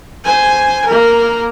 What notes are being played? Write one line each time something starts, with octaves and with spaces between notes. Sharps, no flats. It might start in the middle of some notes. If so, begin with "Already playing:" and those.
C5 G#5
A#3 A#4